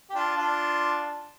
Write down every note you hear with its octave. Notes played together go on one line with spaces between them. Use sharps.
G4
D4 F4
D4 F4